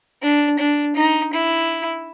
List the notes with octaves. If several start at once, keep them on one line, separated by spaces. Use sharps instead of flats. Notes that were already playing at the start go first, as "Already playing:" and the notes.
D4
D4
D#4
E4